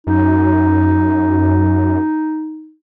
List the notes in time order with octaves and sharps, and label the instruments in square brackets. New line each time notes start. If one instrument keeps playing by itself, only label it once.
[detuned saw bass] F#2 [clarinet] D#4